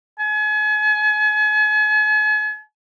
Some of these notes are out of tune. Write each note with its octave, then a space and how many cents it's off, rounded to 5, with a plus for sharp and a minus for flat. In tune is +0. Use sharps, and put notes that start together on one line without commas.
G#5 +40